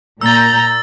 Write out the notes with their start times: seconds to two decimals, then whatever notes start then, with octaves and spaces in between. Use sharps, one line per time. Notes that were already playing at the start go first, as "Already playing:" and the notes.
0.21 A#2 A#5 E6 G6 A6